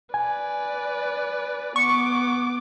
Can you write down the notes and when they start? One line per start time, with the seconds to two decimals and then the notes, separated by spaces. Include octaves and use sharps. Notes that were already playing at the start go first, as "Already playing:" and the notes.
0.14 B4 D5 G#5
1.76 B3 C#6 D6